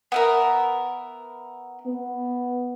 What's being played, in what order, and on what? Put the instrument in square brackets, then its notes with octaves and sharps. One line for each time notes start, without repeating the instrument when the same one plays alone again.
[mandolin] B3 E4 A#4
[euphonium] B3